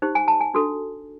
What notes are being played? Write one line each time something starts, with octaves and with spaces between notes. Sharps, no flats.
D#4 G4 C5
G#5
A5
G#5
D4 F#4 A4